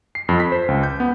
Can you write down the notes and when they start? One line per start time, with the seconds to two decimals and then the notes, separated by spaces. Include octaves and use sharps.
0.15 C7
0.29 F2
0.40 B6
0.52 C5
0.68 C#2
0.83 G6
1.00 B3